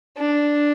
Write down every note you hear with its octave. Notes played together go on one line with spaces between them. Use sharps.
D4